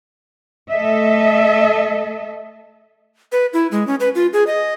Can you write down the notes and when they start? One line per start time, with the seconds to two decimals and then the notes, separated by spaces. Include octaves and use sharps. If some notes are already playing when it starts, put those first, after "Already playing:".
0.71 A3 A4 D#5 E5
3.32 B4
3.53 E4
3.72 G#3
3.87 C#4
4.00 B4
4.15 F4
4.33 G#4
4.47 D#5